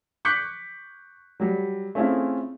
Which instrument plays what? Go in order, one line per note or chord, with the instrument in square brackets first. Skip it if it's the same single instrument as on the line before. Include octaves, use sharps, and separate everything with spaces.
[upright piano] C#6 D6 F#6 G6 B6 C#7
F#3 G3
A3 C4 C#4 E4 F4 G#4